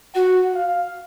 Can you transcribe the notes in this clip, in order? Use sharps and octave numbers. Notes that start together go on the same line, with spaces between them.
F#4 F#5
F5